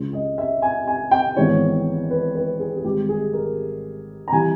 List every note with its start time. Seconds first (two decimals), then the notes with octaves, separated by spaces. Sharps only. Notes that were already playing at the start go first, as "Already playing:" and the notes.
Already playing: C#2 C#3 G#3 C#4
0.13 D#5
0.38 E5
0.62 G#5
0.87 G#5
1.11 G5
1.37 G#1 G#2 E3 G#3 B3 C#5
2.11 B4
2.35 B4
2.60 G#4
2.77 G#4
2.85 G#1 G#2 G3 G4
3.09 G#4
3.33 A#4
4.28 A#5
4.32 E3 G3 G#5